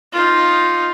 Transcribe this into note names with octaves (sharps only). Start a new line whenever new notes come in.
D#4 F4